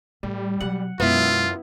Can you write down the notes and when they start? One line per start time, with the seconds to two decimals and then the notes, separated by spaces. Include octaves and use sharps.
0.23 A2 G3
0.60 B2 F#3 F#5
1.00 F#2 B2 G#3 B3 E4 F4